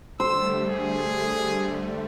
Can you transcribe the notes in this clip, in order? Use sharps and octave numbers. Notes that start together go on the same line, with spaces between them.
D3 G3 A3 C5 E6
G#4